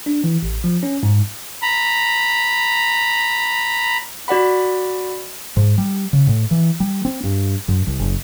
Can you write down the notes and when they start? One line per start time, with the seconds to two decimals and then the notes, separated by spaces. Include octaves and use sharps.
0.06 D4
0.24 E3
0.42 A1
0.64 F3
0.83 C#4
1.03 G#2
1.62 A#5 B5
4.28 F#4 D5 F#5 B5
5.57 G#2
5.78 G3
6.13 C#3
6.27 A2
6.51 E3
6.80 G3
7.05 C4
7.24 G2
7.68 F#2
7.87 C2
7.99 F#1